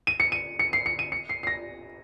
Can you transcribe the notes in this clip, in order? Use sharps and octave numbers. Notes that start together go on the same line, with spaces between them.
D#7
C#7
D#7
C#7
C7
C#7
D#7
C#7
C7
C7
A#6